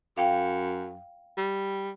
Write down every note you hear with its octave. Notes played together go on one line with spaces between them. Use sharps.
F#2 F5 G5
G3